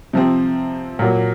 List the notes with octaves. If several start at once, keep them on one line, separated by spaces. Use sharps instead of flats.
C3 F3 C4
A#2 F#3 A#3